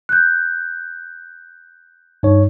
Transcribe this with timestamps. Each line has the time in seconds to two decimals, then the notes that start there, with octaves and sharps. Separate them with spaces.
0.09 F#6 G6
2.23 G2 D#4 C#5